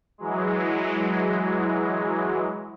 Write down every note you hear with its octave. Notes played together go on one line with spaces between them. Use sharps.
E3 F#3 G#3